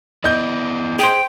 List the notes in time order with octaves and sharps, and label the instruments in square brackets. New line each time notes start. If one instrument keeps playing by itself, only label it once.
[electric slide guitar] B3 E4 D5 [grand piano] D#5 G6
[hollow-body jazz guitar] G#4 C5 [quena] G5